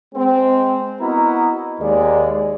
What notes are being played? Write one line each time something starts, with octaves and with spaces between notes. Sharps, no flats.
G#3 C4
B3 E4 F#4 A#4 D#5 A#5
D#2 G#3 D5